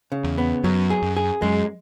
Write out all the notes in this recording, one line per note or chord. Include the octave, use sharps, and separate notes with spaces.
C#3
E2
B3
F#2 F#3
G#4
F#2
G#4
F#2 G#3